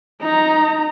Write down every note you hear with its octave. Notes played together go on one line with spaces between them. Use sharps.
D#4 A#5